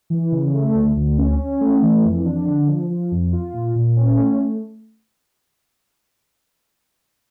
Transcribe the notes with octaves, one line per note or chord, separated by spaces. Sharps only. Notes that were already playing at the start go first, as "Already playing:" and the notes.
E3
C#3
A3
D2
D2
C#4
C#4
A3
E3
F2
D4
D3
F3
F3
F2
F4
A#2
A#2
C#4
A3
A3